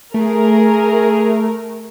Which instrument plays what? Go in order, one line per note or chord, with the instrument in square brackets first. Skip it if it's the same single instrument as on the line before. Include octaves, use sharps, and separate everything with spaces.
[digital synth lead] A3 [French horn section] G#4 [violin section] A#4